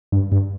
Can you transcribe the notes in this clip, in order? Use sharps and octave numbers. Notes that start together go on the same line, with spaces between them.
G2
G2